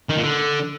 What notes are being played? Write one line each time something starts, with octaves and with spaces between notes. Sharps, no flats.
D#3
A#2
D3